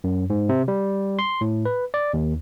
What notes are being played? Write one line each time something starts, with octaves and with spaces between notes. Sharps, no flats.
F#2
G#2
C3
G3
C6
A2
B4
D5
D#2